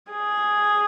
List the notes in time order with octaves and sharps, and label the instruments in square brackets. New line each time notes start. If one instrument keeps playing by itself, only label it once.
[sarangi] G#4